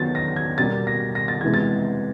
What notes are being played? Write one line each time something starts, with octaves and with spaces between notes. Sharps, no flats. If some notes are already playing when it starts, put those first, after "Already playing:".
Already playing: D#3 F#3 B3 A6
A#6
G#6
B2 G3 A#3 A6
A#6
A#6
A6
C3 E3 G#3 B3 G#6
A6